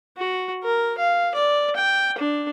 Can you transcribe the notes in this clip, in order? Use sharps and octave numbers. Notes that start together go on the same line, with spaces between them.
F#4
A#4
F5
D5
G5
D4